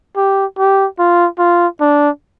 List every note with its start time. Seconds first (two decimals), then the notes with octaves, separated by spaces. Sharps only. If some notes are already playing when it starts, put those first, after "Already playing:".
0.17 G4
0.58 G4
0.99 F4
1.39 F4
1.81 D4